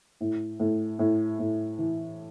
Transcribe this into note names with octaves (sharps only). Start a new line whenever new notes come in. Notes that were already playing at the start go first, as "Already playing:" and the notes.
A2
A2
A2
A2
E3